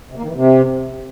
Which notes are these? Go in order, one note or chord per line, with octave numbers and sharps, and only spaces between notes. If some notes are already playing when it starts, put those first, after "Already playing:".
C3
A#3
D#3
E3
C3